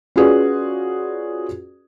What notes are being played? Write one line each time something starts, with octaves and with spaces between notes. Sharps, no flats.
C#4 F4 F#4 G#4 B4 D5